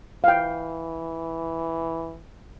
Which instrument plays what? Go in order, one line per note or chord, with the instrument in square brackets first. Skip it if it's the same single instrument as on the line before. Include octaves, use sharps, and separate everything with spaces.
[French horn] E3 [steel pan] F5 G5